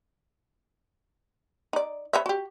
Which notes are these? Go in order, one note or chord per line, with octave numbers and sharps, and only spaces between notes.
D#4 D5
B4 C#5 E5
F#4 G4